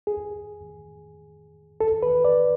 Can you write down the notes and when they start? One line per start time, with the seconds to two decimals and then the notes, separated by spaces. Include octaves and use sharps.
0.07 G#4
1.81 A4
2.03 B4
2.25 D5